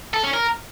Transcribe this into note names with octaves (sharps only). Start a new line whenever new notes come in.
A4
C#4
A#4